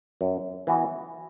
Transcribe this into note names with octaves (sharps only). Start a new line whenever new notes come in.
F#2
E3 B3 F#4